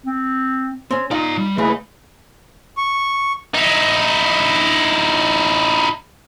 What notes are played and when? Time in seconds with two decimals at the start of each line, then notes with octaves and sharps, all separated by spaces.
0.06 C4
0.91 C4 C#4
1.11 D#4 F4 D5 F5 A#5
1.38 G3
1.58 D#2 C#3 E3 A3 E4 G#4 B4
2.77 C#6
3.54 D#4 E4